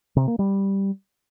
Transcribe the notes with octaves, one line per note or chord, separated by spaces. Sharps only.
C3
A#3
G3